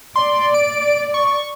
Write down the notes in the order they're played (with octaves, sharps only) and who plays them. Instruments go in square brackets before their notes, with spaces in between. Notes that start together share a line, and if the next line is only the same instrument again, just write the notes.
[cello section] D5 [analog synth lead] C6
[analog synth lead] D7
C#6